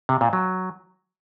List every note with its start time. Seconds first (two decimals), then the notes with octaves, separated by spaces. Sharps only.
0.09 C3
0.21 A#2
0.33 F#3